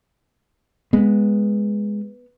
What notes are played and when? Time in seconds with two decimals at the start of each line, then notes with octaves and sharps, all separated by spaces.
0.93 G#3 B3